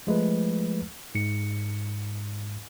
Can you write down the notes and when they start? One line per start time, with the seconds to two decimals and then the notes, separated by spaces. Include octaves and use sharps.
0.07 F3 G#3 A3 B4
1.15 G#2 C#7